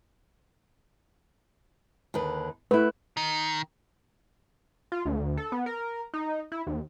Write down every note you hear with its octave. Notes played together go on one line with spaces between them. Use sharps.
D#2 D3 B4
A3 E4 B4
D#3
F4
D2
A4
B3
A#4
D#4
E4
D#2